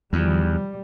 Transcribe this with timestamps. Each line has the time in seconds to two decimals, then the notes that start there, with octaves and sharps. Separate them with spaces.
0.13 E2 D#3 F3 G3